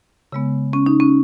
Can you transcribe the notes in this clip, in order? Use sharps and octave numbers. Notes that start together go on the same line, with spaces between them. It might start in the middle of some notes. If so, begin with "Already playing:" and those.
C#3 G#3 B3
C#4
D#4
C#4